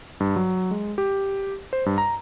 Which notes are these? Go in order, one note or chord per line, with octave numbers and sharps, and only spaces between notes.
G2
F#3
G#3
G4
C5
G2
A#5